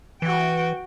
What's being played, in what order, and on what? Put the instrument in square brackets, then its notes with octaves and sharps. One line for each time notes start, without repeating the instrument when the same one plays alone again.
[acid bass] E3 [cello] F#4 G5